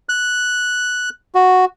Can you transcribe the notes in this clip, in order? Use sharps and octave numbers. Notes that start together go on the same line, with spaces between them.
F#6
F#4